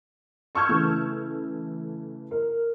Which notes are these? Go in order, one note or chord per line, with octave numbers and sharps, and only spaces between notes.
A5 C#6 E6 F6 G6 G#6
C#3 E3 A3
A#4